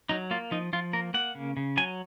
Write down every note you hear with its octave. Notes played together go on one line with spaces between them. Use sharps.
F#3 D#4
A#3 F4
F3 D#4
F3 F4
A#3 A#4
A#3 F#5
C#3
C#3
F#3 G#5